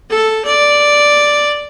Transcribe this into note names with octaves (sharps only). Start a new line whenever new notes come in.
A4
D5